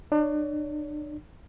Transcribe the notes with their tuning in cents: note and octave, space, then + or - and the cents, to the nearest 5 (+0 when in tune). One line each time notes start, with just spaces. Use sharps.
D4 +40 C#5 +45